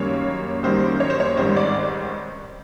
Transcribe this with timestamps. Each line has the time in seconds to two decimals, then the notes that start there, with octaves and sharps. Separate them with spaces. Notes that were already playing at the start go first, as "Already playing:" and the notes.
Already playing: F#2 D#3 G3 A#3 C#4 C#5
0.63 F#2 D#3 G3 A#3 C#4 C5
1.00 C#5
1.10 C5
1.20 C#5
1.37 A1 G#2 D#3 G3 C4 C5
1.57 D5